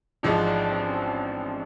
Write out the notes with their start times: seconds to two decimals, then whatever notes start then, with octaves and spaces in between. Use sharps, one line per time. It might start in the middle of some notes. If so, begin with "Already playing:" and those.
0.23 A1 G#2 F3 G#3 D4
0.47 D4
0.70 C4
0.87 C#4
0.94 C4